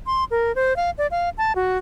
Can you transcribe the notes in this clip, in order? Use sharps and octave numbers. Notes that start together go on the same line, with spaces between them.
C6
A#4
C5
F5
D5
F5
A5
F#4